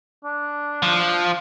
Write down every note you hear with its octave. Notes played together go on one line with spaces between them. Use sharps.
D4
F3